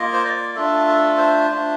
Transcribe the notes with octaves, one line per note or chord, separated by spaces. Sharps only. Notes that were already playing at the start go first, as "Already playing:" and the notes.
Already playing: A#3 F4 D#5
C5
D5
A3 D4 F4 A4
A4
C5
A3 D4 F4